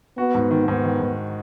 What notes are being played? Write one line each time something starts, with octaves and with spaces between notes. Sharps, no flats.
B3 F#4
G#2
D#3
G#2 B3
D#3
G#2